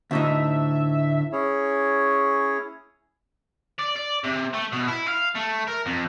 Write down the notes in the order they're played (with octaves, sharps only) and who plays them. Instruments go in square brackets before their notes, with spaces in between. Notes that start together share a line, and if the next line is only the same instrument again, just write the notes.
[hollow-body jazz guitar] D2 A2 D#4 [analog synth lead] E5
[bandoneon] C#4 E4 G#4 C#5
[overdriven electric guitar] D5
D5
C3
A3
B2
E4
F5
A3
A#4
F2